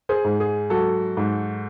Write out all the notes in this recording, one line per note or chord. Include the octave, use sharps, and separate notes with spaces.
G#4 C5
G#2
G#4
F#3 F#4 A4
G#2